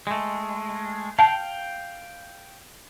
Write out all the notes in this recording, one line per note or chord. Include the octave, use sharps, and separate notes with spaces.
G#3 A3
F5 G5 A5